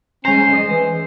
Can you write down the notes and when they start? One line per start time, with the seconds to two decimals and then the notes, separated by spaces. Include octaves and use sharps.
0.25 G#3 C#4 C5 A#5
0.49 G#3 D#5
0.67 E3